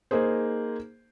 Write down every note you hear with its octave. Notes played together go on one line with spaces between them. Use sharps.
A#3 D#4 G#4 C5